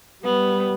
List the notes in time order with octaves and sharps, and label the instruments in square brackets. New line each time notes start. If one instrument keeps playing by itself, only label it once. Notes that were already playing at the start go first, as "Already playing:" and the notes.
[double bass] G3 [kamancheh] B3